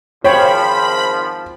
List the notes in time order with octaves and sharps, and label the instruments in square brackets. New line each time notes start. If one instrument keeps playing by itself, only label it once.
[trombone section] G#1 F3 [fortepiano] C5 G5 [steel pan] C#5 [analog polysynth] B5